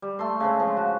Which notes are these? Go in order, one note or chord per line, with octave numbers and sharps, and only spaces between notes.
G3
A3 A4 C6
C#3 G#3 C4
F3
F#4